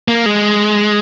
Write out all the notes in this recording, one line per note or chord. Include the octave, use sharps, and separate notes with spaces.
A#3
G#3